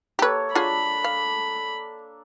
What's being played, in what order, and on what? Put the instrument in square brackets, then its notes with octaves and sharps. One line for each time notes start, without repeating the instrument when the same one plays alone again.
[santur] A#3 A4 C#5 [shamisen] G4 B4
[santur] D4 [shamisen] F4 F#4 G#4 [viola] B5
[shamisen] F5